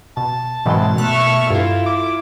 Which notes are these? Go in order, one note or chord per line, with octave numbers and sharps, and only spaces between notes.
B2 A5
G#2 B2 D#3 E3 F#3 C4 C6
B2 A3 E5 C#6 F6 F#6
G2 E4 F4 A4 F5
D6